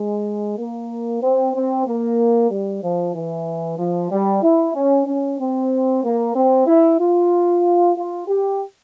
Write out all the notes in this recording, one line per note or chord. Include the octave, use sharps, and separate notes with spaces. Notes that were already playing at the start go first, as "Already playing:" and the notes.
Already playing: G#3
A#3
C4
C4
A#3
G3
F3
E3
F3
G3
E4
C#4
C#4
C4
A#3
C4
E4
F4
F4
G4